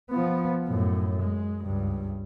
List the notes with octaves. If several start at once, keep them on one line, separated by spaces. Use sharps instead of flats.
F3 B3
F#2 A2
G#3
C#2 G2